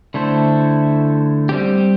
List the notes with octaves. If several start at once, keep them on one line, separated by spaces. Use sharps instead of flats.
D3 A3 E4 A4 C5
G3 C4 G4